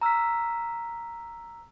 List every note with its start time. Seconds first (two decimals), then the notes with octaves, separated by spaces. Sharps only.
0.01 A#5 E6 F6 B6